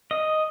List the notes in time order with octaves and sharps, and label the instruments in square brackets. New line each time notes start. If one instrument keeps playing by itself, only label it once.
[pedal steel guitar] D#5